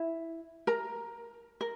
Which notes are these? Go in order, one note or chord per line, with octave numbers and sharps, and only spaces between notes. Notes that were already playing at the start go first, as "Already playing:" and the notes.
Already playing: E4
A#4 A#5
A#4